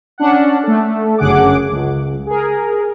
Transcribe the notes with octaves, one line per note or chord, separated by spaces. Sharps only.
C#4 D4 F#5
A3 A4
G1 F#2 C#3 G#4 F#5 D6
C#2
G#4 A#4